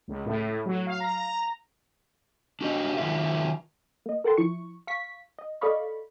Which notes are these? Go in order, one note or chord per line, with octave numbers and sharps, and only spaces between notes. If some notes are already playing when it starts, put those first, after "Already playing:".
C#2
A2
F#3
F5
A#5
A#5
D4 F#4 G4 D#5
D#3 F#3 F4 G4 G#4 E5
A#3 D#5
A4 A#4 F#5 G5 A5 C6
F3 E4 C#6
F5 C#6 B6
D#5
A4 D5 D#5 F5 B5 C#6